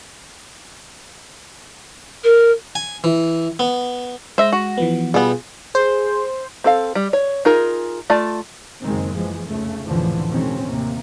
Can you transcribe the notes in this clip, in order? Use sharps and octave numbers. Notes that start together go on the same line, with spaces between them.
A#4
G#5
E3
B3
G#3 C5 E5 A#6
F#4
E3 F3 B3
B2 G3 B3 F4 G#4
G#4 C5
C4 A4 F5
G3
C#5
D#4 F4 G#4 A#4
A3 F4 D5 A5
F#1 C#2 D#3 G#3 C4
F2 E3 F3 G#3
F1 C#2 C#3 A3
F1 C#2 A2 D3 E3 F3
B2 D#3 F3 G#3 C4 C#4
A1 D#2 C3 A#3